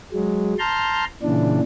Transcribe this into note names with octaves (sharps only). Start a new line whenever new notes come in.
F#3 G#3
A5 A#5 C6 F6 G6
A#2 C#3 E3 D4